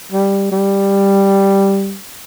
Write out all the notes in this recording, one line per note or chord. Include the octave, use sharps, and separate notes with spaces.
G3
G3